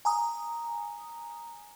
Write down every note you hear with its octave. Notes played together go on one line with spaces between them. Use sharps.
G#5 A#5 D#6